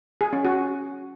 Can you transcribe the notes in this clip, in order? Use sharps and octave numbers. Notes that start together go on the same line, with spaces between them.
G#4
C#4
F#4